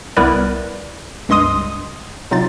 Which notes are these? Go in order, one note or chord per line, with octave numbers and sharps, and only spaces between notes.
C2 B3 E4 A#4 B4 D5
C#2 G2 D#5 C6 D#6 D#7
C3 F#3 D#4 F4 A6